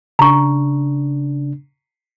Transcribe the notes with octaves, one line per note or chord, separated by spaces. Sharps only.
C#3 D4 A#5 C#6